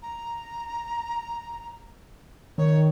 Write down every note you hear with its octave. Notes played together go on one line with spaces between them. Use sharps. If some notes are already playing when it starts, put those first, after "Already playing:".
A#5
D#3 C#5